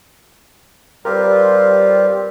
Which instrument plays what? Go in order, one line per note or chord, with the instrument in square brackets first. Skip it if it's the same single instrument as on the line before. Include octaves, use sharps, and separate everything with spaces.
[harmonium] G3 [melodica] C4 F4 G4 [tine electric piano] A#4 B4